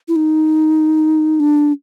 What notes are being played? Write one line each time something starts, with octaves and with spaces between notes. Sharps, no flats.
E4
D#4
D4